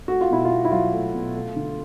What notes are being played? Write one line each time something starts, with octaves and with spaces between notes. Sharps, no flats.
A3 F#4
F4
B2 E4
F4
B2
E4
F#3 F4
A3
B2
A3
D3